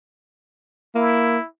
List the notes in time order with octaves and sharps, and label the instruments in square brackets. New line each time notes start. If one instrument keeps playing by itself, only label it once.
[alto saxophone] A#3 [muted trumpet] E4